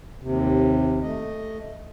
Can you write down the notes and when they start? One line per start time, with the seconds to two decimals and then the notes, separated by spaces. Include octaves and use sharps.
0.22 D#2 C3
1.02 A3 D#5